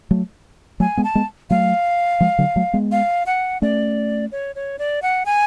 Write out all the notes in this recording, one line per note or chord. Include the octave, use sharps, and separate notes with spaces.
F#3 A3
F#3 A3 G#5
G#3 B3
A5
G#3 B3
F#3 A3 F5
F3 G#3
D3 F#3
F#3 A3
G#3 B3
F5
F#5
A3 C#4 D5
C#5
C#5
D5
F#5
G#5